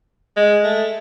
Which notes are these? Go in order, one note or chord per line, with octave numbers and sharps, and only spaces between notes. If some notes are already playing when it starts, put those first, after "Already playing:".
G#3
A3